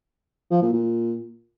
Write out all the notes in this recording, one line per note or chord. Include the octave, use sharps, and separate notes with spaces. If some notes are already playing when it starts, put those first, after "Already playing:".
F3
A#2
A#2